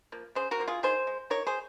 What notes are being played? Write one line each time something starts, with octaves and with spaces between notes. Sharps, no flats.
F3 A#3
C#3 G#4 C5
F#4 A#4
F3 A#3
F4 G#4
D#3 G#4 C5
G#3
D#3 A#4 C#5
G#4 C5